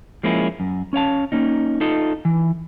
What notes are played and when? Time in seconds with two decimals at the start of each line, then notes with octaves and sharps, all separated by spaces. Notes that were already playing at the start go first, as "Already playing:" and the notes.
0.23 F3 G#3 A#3 C#4 E4
0.60 F#2
0.93 C#4 C#5 F5 A5
1.32 A#3 C#4 D#4
1.81 D#4 F4 A4 D#5
2.25 E3